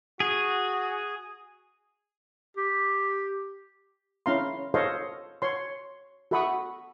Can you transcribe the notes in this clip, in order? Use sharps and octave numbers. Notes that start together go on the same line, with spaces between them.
F#4 G#4
G4
C#4 E4 F5 A#5 C6
A4 C5 C#5 D#5 F5 C6
C#5 C6
F#4 A4 E5 B5 C#6 D#6